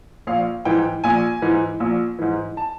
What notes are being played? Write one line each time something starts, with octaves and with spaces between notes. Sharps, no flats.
A#1 F5
G#2 E3 G5
A#1 G#5
G#2 E3
A#1
G#2 E3
A5